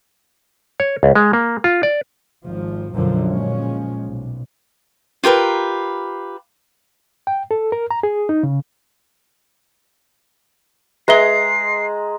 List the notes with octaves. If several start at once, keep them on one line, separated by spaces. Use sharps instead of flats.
C#5
C#2
G#3
A#3
F4
D5
G#1 F3
B1 F#2 D3 F3
A#2 F3 G#3 C#4
B1
F4 G4 A#4 B4
G5
A4
A#4
A#5
G#4
D#4
C#3
G#3 G#4 B4 E5 A#5 C7 G7